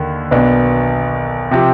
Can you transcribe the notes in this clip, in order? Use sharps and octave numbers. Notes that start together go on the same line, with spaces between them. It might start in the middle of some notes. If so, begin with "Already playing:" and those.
Already playing: D#2 D3
B1 B2 B3 D4
C3 F3 C4 G4